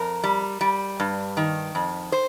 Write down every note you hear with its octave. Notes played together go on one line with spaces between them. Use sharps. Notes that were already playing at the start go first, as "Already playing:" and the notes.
Already playing: F2 A#4
G3
G3
G2
D#3
F2
C5